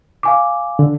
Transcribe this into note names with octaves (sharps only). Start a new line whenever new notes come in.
F5 G#5 D6
D3